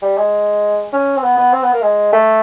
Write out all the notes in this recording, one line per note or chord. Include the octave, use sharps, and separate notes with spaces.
G3
G#3
C#4
C4
B3
B3
C4
B3
A#3
G#3
A3